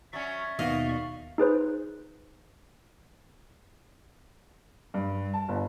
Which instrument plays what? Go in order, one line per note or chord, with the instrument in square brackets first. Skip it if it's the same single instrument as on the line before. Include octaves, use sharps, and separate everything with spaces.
[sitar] F#3 C#4 [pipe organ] D5 E5 C#6
[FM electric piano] D#2 B2 D#3 [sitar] F#4 D#5 [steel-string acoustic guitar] F5
[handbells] D#4 G#4 B4 C5
[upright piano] G2
A5
G1